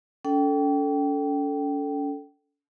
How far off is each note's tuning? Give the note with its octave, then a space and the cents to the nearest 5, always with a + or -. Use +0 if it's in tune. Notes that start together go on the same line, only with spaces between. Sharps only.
C#4 +45 A4 +0 G5 -15